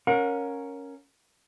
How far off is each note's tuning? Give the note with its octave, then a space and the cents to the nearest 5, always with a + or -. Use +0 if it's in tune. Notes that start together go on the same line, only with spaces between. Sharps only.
C#4 +0 A#4 +0 F#5 -45